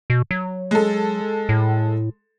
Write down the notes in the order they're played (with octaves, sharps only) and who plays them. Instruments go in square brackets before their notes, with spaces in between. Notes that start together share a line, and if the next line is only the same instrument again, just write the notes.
[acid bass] B2
F#3
[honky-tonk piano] G#3 A4
[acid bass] A2